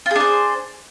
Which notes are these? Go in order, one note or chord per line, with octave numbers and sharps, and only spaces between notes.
D4 F4 G#4 C5